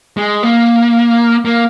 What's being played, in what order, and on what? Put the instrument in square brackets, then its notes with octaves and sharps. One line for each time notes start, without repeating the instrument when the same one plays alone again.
[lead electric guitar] G#3
A#3
A#3